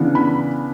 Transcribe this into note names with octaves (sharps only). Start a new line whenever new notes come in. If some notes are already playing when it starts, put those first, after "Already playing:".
Already playing: C#3 E3 B3 D4
B5